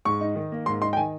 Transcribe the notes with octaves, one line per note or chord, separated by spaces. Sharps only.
G#2 C#6
D#4
D#3
A#3
G#2 C6
D#4 C6
G5
D#3 G#5